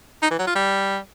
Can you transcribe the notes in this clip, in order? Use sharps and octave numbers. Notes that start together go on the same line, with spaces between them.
D#4
E3
F#3
F4
G3